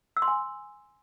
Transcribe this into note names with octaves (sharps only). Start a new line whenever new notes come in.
E6
C6
G#5